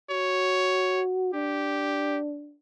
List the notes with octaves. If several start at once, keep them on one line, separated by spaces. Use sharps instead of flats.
F#4 C#5
D4 G4